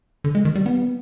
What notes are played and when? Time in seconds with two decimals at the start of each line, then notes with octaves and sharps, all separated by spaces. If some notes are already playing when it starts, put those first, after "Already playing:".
0.24 D3
0.35 G#3
0.45 D#3
0.55 G3
0.66 B3